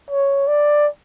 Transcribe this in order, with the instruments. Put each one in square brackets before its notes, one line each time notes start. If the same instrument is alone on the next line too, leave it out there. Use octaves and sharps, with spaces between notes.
[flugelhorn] C#5
D5